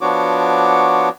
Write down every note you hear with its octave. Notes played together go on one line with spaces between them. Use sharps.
F3 B3 D4 F#4 C#5 D6